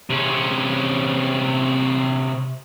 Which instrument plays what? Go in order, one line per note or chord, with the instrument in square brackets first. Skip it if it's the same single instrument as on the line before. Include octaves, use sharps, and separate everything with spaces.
[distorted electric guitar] C3 C#4